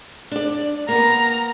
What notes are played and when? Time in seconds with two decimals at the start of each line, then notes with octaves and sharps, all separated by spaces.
0.32 D4 D5
0.88 A#3 B3 A#5